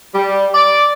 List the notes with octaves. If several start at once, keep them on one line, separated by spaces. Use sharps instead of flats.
G3
D5